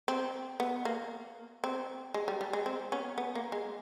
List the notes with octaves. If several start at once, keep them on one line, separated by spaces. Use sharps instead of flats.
C4
B3
A#3
C4
G#3
G3
G3
G#3
C4
B3 C#4
B3
A#3
G#3